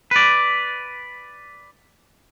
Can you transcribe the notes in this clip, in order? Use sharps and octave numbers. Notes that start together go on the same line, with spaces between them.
B4 D5